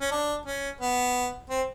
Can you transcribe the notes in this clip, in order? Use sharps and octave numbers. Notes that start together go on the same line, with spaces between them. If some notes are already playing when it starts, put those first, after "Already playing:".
C#4
D4
C#4
B3
C4